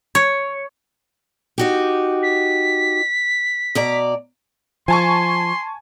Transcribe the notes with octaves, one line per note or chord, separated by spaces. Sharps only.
C#5
D#4 F#4 G4
B6
B2 D5 A#5
F3 G#5 A5 C6 C#6